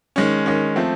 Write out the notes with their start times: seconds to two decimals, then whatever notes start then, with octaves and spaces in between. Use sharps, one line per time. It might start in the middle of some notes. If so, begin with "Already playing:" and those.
0.16 D#3 G#3 C#4
0.46 D#3 G#3 C#4
0.76 F3 A3 C4